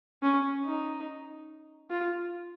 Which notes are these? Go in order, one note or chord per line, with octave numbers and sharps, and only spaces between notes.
C#4
D#4
F4